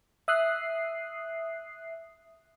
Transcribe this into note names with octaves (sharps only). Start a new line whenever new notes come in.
E5 D#6 F#6 C7